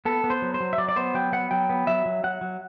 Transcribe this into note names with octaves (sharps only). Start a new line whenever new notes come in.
B3 A4
B3
C5
F#3
C5
F#3
E5
F#3 D5
D5
B3 C5
F#3 G5
B3 F#5
F#3 G5
B3
F#3 E5
F#3
F#3 F#5
F#3